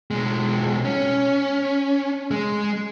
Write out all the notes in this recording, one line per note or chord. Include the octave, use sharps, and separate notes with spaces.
B1 G#3
C#4
G#3